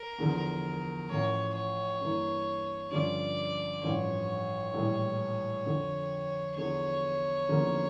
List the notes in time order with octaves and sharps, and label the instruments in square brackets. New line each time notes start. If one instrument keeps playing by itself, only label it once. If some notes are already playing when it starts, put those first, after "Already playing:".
Already playing: [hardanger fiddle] A#4
[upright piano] E2 D3 F3
[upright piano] A1 A2 F3 [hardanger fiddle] C#5
[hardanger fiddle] C#5
[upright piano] G2 E3 A#3
[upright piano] G2 D3 F3 C#4 F4 [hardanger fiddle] D5
[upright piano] A1 G2 F3 [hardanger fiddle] C#5
[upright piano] A#1 A2 E3 G3
F2 D3 F3
[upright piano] E2 D3 F3 [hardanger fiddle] C#5
[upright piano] E2 D3 F3 A#3 C#4